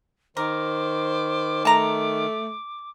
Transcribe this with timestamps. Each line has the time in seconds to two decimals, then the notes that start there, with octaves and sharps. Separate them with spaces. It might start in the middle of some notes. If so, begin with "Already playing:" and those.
0.37 D#3 A#4 C5 D6
1.65 A3 A5 A#5